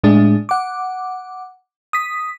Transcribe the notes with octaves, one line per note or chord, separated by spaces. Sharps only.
A2 G#3 D4 G#4
F#5 D6
D#6 B6